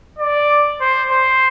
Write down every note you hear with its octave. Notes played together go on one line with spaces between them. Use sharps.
D5
C5
C5